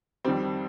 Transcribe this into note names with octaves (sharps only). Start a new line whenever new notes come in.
F2 D#3 G3 C4